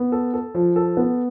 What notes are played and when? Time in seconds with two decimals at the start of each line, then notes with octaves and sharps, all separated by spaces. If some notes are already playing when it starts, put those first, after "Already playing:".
Already playing: B3
0.12 A4
0.34 A4
0.54 F3
0.76 A4
0.97 B3